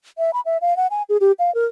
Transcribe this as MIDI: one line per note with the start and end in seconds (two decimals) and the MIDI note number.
0.18 0.31 76
0.33 0.41 83
0.46 0.58 76
0.61 0.76 77
0.77 0.87 78
0.91 1.03 80
1.09 1.17 68
1.21 1.32 67
1.39 1.53 77
1.55 1.65 70